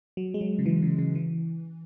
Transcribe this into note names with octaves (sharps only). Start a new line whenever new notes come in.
F#3
G#3
F#3
C#3
E3
C#3
C#3
E3